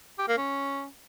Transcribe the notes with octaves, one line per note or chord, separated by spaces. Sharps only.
G4
A#3
C#4